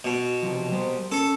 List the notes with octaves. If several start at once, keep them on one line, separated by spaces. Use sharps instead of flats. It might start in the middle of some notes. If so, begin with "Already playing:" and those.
B2
C3 F3
G3 C5
C#4 A4